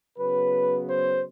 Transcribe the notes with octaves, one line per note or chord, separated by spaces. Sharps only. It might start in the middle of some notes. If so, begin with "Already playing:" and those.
C#3 F#3 B3 B4
C5